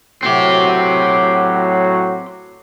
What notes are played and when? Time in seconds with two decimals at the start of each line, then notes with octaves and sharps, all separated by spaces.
0.23 A2 F#3 C4 F#4 G4